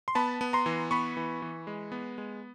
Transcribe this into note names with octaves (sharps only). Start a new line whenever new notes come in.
C6
B3 A5 B5
B3
A#5 C6
E3
B3 B5 C#6
E3
E3
G#3
B3
G#3